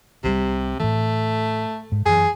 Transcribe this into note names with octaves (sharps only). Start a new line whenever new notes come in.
C2 C3 F#3 G3
A2 E3 A3
G#2
F#2 E3 G#4